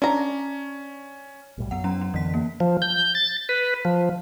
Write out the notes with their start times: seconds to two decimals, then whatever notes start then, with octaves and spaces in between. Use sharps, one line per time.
0.02 C#4 D4 A#5
1.58 B1 A2 G3
1.71 F#2 B3 F#5
1.84 F#3 C#4 A#5
2.01 C#4
2.14 F2 D3 E3 B3 B6
2.34 A#3
2.60 F3
2.82 G6
3.15 A6
3.49 B4
3.85 F3